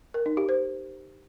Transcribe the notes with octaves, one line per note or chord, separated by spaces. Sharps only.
A#4
D#4
G4
C5